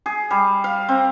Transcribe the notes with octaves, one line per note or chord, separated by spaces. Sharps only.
G#4
G3
F5
C4